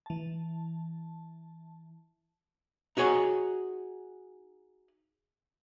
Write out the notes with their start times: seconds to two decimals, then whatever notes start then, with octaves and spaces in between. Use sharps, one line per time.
0.06 E3 A5
2.97 D#4 F#4 G#4 C#5